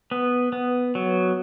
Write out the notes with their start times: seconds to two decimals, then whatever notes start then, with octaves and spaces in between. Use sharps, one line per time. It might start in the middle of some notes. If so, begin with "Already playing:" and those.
0.11 B3
0.53 B3
0.95 F#3